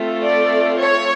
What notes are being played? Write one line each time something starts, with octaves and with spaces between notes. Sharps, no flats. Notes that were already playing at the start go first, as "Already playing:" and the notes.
Already playing: A3 C4 F4 A4
D5
C#5